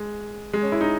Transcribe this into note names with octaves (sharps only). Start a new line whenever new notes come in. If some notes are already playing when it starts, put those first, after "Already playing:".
Already playing: G#3
G#3
C#4
E4
D#4